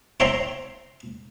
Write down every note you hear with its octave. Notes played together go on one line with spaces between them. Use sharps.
C5 C#5 E5 G5 A#5 C6